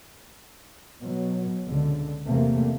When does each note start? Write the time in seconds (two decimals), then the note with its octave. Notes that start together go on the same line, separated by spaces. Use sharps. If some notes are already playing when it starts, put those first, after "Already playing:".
1.02 B2 F#3
1.65 C#2 D3
2.26 E2 C3 A3 A#3